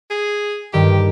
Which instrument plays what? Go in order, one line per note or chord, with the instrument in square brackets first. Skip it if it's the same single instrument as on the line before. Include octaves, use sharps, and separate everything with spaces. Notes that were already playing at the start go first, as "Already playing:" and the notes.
[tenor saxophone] G#4
[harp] G2 D#3 [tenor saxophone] G4